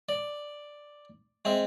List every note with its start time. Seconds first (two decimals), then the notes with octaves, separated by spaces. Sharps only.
0.09 D5
1.45 G#3 C4 E5